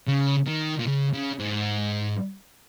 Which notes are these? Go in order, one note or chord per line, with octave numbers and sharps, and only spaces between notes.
C#3
D#3
A#2
C#3
C#3
G#2